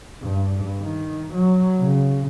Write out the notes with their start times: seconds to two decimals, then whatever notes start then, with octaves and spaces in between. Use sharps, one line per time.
0.23 G2
0.83 D#3
1.34 F#3
1.80 C#3